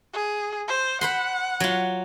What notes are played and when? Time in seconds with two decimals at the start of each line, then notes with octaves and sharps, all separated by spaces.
0.14 G#4
0.68 C5
1.01 C5 F#5 B5 C6
1.60 F#3 F4